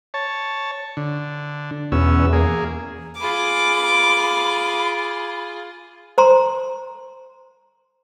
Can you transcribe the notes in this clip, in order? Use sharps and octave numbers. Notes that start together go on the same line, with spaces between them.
C#5 A5
D3
E2 B2 C#4 E6
A#3 G#4
F4 G#4 B5 D6
C5 A#5 C6